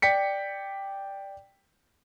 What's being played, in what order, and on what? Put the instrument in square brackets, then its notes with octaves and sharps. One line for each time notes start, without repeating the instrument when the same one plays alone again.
[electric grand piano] D5 G5 B6 C#7